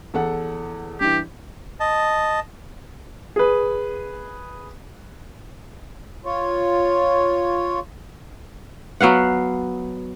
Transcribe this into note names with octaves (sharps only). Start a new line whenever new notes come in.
E2 A4 F#5
G2 E3 G4
D#5 A5
G#4 B4
F4 C#5
F#3 B3 F5 F#5